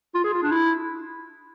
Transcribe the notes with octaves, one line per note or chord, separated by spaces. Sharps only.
F4
G#4
F4
D4
E4